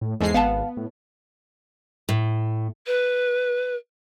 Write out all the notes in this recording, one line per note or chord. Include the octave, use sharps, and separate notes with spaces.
A2
E2 G#2 G#3 A4 C7
G#1 B3 F5 A5
A2
A2
B4